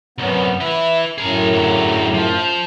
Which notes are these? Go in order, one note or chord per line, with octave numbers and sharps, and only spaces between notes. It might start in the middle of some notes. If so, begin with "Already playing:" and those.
C2 F#2 B3 C#4
E4 B4 E5
F#2 A2 C#3 G#4 A#4
D3 F#3
F3